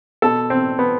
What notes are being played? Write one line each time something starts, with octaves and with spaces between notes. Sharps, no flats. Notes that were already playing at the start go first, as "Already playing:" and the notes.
B2 A4
C4
B3